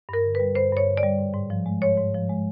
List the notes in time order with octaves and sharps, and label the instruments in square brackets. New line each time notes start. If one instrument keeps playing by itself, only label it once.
[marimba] G2 A#4
D3
G3 B4
G2 C5
G2 C#5
D3
D5
G3
G#2
G#2
F3
G#3
G#2 C#5
G#2
F3
G#3